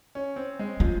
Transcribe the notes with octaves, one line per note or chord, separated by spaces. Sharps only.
C#4
C4
G#3
F3 C#4